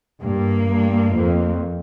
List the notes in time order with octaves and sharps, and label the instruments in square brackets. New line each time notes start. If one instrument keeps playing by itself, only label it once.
[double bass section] G2 [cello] A#3
[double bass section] G2
F2